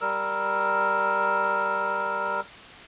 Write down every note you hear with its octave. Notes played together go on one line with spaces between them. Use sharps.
G3 A#4 E6